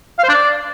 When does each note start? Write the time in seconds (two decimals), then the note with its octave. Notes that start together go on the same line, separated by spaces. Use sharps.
0.19 F5
0.24 C5
0.29 D4
0.34 D5